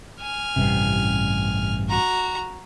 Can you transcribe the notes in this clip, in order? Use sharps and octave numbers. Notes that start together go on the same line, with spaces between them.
G#5 F6
A1 G2 C3
F#4 A#5